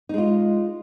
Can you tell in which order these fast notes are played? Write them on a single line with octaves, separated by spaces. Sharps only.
D#4 G#3 F4